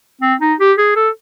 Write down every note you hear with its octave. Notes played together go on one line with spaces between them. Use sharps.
C4
D#4
G4
G#4
A4